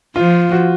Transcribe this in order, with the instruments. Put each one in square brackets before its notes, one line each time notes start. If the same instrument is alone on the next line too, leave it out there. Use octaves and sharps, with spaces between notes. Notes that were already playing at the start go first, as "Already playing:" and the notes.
[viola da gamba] F3 [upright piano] F4
[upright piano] F#4